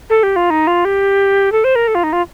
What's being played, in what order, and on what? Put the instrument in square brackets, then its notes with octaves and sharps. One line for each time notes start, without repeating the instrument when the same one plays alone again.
[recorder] A4
G4
F4
D#4
F4
G4
A4
C5
A#4
A4
F4
D#4
F4